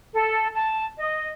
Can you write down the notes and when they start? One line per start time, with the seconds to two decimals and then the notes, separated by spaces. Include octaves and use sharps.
0.14 A4
0.55 A5
0.99 D#5